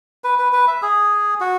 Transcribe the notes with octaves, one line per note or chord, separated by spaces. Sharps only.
B4
B4
B4
E5
G#4
F#4